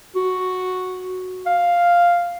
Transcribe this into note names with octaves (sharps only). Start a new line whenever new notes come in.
F#4
F5